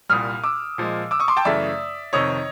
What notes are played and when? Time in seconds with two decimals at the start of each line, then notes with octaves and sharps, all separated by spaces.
0.09 C2 A#2 G3 D#6 F6
0.44 D6 E6
0.78 A#2 F3 G#3
1.11 D6 E6
1.20 C#6 D#6
1.28 C6 D6
1.37 G5 A5
1.45 F#2 C#3 E3 A3 D5 E5
2.13 F2 C3 D#3 C#5 D#5